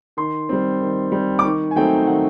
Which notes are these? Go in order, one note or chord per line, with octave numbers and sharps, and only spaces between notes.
D#3 C6
G3 C4
D#3
G3 C4
D6
D#3 C#6
G#5
F#3 A3 C4 D#4 G5
D#3 F#5